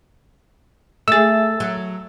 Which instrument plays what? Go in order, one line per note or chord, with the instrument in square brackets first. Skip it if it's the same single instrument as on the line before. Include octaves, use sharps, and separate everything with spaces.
[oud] A3 G#4 [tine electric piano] E6 A6
[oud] F#3